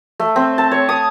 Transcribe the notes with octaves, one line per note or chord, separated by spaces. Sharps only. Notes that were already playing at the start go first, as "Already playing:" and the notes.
A3
C4
A5
C#5
D#6